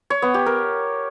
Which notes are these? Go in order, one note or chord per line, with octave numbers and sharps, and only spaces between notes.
C#5
B3
G4
A#4